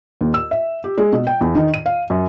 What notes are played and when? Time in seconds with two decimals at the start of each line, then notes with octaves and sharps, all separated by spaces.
0.21 D#2
0.34 E6
0.51 E5
0.84 G4
0.98 G#3
1.12 B2
1.27 G5
1.41 E2
1.55 D#3
1.74 D#7
1.86 F5
2.10 F#2